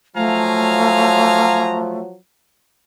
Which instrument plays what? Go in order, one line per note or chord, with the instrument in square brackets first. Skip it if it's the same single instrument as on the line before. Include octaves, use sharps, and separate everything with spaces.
[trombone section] F3 F#3 [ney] A3 [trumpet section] F5 G#5 A#5